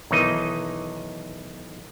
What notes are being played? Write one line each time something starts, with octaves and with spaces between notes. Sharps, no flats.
B1 D#3 E3 D#4 D#5